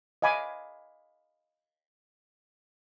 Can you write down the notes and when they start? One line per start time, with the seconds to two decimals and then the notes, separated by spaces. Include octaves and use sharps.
0.22 D#5 F5 G#5 B5 D6